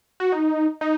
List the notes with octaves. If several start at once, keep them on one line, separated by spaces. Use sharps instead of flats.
F#4
D#4
D#4